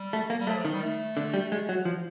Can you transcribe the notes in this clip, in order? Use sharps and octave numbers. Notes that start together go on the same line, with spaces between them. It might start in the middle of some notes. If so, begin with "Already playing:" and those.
Already playing: G3
A3
A#3
G3
F#3 A3
F3
D#3
G3
A3
D3
G3
G#3
F#3
F3